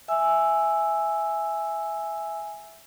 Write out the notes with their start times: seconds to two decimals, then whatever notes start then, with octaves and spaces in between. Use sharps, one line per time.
0.08 E5 G#5 E6